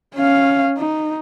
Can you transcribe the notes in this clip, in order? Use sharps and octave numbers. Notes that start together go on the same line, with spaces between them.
C#4 F5
D#4